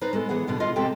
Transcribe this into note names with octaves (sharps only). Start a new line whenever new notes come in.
D#4 B4 C5 D5 A#5
G#3 B3 A4
E3 B3 G#4 F#5
G2 B2 D3 B3
F4 D#5 F5 F#5
C3 G#3 C4 G4 A4 G5